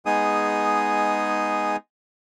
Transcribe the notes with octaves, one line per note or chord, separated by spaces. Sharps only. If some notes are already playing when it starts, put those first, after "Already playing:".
G#3 B3 D#4 G#4 D#6